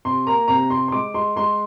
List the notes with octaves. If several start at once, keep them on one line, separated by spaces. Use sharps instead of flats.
C3 C6
A#3 A#5
C3 A#5
C3 C6
C6
G#3 D6
G#3 C6
G#3 C6